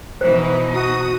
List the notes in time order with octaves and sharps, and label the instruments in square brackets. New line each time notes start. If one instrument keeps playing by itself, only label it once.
[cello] B2 D#4 [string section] E3 [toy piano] C5
[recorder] F#4 [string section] D#6